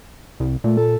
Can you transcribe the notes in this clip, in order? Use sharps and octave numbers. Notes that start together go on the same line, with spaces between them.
C2
A#2 A3
A4